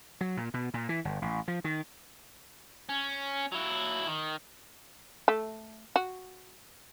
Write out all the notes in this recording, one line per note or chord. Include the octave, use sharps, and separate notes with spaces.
F#3
A#2
B2
A#2
E3
G1
A1
F3
D#3
C#4
F#3 E4
D#3
A3
F#4